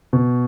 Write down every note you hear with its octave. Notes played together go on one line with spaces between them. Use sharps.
B2